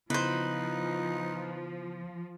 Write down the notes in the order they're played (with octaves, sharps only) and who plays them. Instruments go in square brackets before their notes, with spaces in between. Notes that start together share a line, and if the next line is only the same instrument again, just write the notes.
[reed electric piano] C#3 B3 E4 [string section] F3 [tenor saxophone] D#4 [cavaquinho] B4 C5